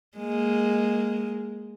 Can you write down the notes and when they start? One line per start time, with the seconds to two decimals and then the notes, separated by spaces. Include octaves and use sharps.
0.18 G#3 A#3